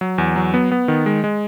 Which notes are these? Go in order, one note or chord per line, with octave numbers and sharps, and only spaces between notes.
F#3
E2
F#3
B3
B3
D#3
G#3
G#3